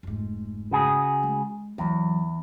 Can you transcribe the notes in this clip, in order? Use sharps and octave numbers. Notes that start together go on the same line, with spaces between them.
F1 G#2
C#3 F#4 G#4
G#3
E2 E3 F#3